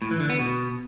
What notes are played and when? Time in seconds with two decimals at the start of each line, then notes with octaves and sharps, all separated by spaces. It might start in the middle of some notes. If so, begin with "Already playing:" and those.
0.02 A2
0.11 E3
0.20 D3
0.30 B3
0.39 B2